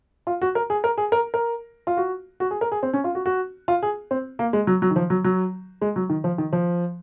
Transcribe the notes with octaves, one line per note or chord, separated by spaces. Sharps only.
F4
F#4
A#4
G#4
A#4
G#4
A#4
A#4
F4
F#4
F#4
G#4
A#4
G#4
C4
C#4
F4
F#4
F#4
F4
G#4
C4
A#3
G#3
F#3
F#3
D#3
F3
F#3
F#3
G#3
F#3
D#3
F3
D#3
F3